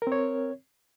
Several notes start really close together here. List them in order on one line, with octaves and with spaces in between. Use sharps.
A#4 C4 C#5